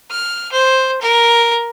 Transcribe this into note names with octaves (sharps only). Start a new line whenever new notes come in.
F6
C5
A#4